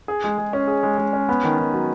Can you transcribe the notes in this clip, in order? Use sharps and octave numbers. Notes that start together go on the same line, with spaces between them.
G#4
G#3
G#3
C#4
G#4
G#3
G#3
C#4
B3
D#3
D#3
F#3